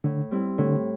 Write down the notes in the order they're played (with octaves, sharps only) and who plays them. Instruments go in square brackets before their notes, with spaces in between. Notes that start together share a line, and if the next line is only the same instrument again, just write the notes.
[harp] A2 [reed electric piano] D3
[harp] G3 C4 E4
[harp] A2 [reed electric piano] D3